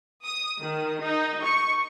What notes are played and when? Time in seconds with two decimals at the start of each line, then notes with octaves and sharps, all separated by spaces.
0.24 D#6
0.62 D#3
1.03 D#4
1.43 C#6